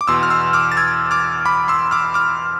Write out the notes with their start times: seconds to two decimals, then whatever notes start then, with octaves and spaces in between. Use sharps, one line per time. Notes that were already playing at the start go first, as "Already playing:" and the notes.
0.01 D6
0.08 E2 B2 C6 E6
0.23 F6
0.30 C6 E6
0.53 D6 F6
0.72 A6
0.77 E6 G#6
1.11 D6 F6
1.45 B5 D6
1.68 C6 E6
1.91 D6 F6
2.14 D6 F6